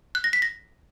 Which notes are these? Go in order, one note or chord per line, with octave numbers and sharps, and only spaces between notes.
F#6
A#6
B6
A#6